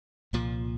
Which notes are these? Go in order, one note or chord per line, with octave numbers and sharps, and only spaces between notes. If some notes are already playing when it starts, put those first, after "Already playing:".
C2 A#2 F3